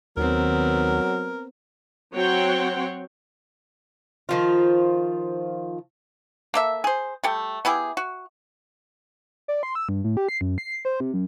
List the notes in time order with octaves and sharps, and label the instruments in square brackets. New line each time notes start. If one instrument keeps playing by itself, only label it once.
[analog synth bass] D#2 [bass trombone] F#3 [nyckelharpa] B3 C4 [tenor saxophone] A#4
[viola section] F#3 C4 C#5 F#5 G5 C6
[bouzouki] D#3 F3 F4
[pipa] A#3 A4 E5
G#4 C5
G3 A3 A4 G5
B3 E4 G4 G#4
F#4
[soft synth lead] D5
C6
E6
G2
A2
G4
C7
F#2
C7
C5
C3
F#2